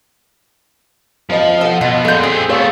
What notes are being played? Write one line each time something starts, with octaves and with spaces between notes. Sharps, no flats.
F2 F3 D#5 F5
A4 D#5 F#5
B2 F4
A#2 G#3 F4 A4 G6
C4 G4 G#4
A3 B3 G#4 C#5 F5